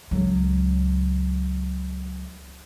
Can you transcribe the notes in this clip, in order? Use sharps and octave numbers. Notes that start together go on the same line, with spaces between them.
C#2 F#3